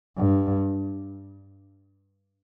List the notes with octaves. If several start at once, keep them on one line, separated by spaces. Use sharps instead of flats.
G2